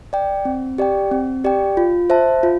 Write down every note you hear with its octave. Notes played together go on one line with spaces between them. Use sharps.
D5 G5
C4
G4 D5 G5
C4
G4 D5 G5
F4
C5 E5 A5
F4